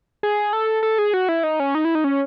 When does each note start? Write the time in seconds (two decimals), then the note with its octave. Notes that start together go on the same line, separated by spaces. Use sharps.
0.23 G#4
0.53 A4
0.83 A4
0.98 G#4
1.14 F#4
1.29 E4
1.44 D#4
1.60 C#4
1.75 D#4
1.85 E4
1.95 D#4
2.04 C#4